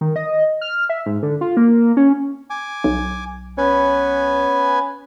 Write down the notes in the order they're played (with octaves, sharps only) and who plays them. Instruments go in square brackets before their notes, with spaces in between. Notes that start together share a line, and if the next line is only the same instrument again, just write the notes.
[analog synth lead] D#3
D#5
F6
E5
G#2
D3
F4
A#3
C#4
[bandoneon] G#5 D6
[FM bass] B1
[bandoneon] B3 B4 G#5 [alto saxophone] C#4